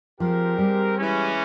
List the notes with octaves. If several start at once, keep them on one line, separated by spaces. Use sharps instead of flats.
F3 G#3 C4 G4 A#4
G3
E3 G#3 C#4